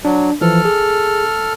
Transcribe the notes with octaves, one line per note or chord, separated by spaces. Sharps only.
F#3 D4
E3 F3 A4 F6
G#4